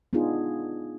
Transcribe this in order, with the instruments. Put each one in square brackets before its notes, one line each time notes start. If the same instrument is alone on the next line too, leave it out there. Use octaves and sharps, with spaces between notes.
[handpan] B3 D4 D#4 F4 G#4